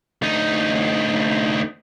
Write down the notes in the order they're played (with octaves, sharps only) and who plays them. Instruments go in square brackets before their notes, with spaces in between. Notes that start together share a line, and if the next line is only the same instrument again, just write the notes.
[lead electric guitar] D2 D#4